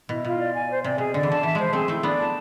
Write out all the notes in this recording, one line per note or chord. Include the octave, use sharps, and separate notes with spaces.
B2 E4
B2 F4
D5
G#5
C5
C3 D5
B2 G#4
D3 D5
E3
D3 A5
E3 E5
F3 G#3 C5
A3 C4 G#4
A3 C4 E4
B3 D4 D5
A5